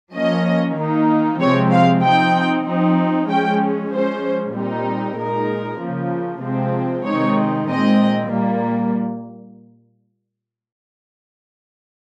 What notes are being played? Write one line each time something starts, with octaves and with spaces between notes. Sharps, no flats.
F3 A#3 C#4 D#5
D#3 A#3 D#4
C3 F3 G#3 C4 C#5
F5
F3 C4 D#4 G5
F3 C4 D#4
F3 G#3 C#4 G5
F3 G#3 C#4 C5
A#2 G3 C4 D#4
A#2 G#3 D#4 A#4
C#3 F3 A#3
C3 F3 G#3 C4
C3 D#3 G#3 C4 D#4 C#5
A#2 G#3 C4 D#5
A#2 G3 A#3